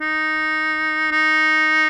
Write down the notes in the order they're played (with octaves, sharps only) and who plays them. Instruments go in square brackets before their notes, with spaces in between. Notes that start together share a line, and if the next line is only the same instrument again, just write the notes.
[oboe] D#4
D#4